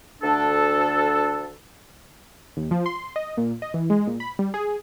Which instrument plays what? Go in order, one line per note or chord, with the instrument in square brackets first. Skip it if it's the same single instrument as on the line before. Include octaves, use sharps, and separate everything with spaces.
[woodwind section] D2 D4 A4
[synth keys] D#2
F3
C6
D#5
A#2
D#5
E3
G#3
A#2
B5
G3
G#4